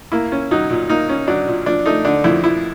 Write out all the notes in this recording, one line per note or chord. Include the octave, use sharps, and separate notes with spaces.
A#3 E4
C#4
F#3 D#4
A#2
A#3 D#4
C#4
F#3 D4
A#2
F3 D4
A3 D#4
D3 D4
F2 E4
F3 E4